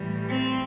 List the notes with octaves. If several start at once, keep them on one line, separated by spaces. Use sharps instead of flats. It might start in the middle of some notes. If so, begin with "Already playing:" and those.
Already playing: A2 E3 G3
C4